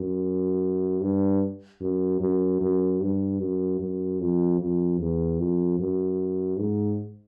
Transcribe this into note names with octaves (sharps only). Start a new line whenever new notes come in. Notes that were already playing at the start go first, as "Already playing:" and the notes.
Already playing: F#2
G2
F#2
F#2
F#2
G2
F#2
F#2
F2
F2
E2
F2
F#2
G#2